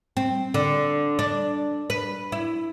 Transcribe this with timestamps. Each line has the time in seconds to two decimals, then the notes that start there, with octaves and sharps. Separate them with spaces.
0.17 C4
0.54 D3
1.19 D4
1.90 B4
2.32 E4